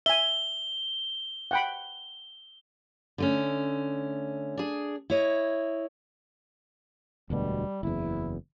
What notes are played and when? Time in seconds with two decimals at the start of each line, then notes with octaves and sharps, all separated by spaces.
0.06 E5 G#5 G7
1.51 F#5 G5 B5
3.18 D3 A3 C#4
4.57 D4 G#4
5.10 E4 C#5 D#5
7.30 E1 D2 B2 G3
7.83 F#1 E2 E4